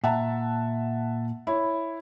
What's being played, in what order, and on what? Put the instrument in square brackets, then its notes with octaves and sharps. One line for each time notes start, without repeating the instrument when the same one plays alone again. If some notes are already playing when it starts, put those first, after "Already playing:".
[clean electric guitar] A#2 A#5 [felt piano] E5 F#5 A5
[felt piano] E4 C#5